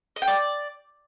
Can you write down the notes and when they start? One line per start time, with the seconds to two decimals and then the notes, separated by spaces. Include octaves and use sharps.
0.16 D#5
0.22 G5
0.27 D5